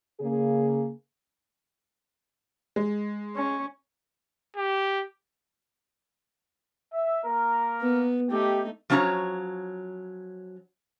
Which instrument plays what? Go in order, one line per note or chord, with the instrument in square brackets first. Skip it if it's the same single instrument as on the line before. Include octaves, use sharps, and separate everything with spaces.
[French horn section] C#3 A#3 G#4
[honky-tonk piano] G#3
[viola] C#4
[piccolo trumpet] G4
[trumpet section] E5
A#3 A#4
[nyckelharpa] B3
[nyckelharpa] A3 D#4 [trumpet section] G4
[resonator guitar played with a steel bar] F3 F#3 C#4 D4 C#5 A#5